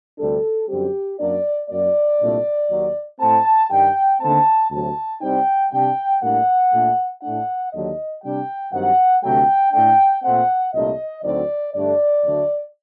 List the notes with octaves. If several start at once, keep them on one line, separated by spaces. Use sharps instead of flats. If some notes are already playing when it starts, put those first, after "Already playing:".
D2 C3 G3 D4 A4
F#2 D3 G3 C4 G4
F#2 F#3 A#3 D4 D5
F#2 F#3 A#3 D5
C2 A#2 A3 D4
D#2 D#3 F#3
A2 A3 C4 A5
G2 D#3 G3 G5
D#2 D3 A3 C4 A5
D2 C3 F#3 A5
C2 C3 G3 C4 D#4 G5
C3 G3 D4 G5
A2 G3 A#3 D4 F#5
A#2 A3 D4
A2 A3 D4 F#5
D#2 D3 F#3 D#5
C3 G3 D4 G5
G2 D#3 F#3 C4 F#5
D2 C3 F#3 A3 G5
A2 A3 D4 G5
A#2 A3 C4 F#5
C2 A#2 A3 D4 D#5
D2 D3 F#3 C4 D#4 D5
G2 D3 A3 D4 D5
D2 D3 F#3 A3